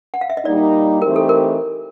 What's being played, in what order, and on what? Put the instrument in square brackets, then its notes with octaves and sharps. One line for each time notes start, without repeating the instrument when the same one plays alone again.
[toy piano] F#5
F5
E5
D#5
[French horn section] A#2 G3 A#3 D#4 [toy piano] D5
[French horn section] E3 A3 C4 D#4 G4 [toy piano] A#4
[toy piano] A4
A#4